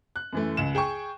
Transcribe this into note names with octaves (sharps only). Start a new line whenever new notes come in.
F#6
F#2 E3 A3
C#2 E7
G#4 G5 G#5 C#6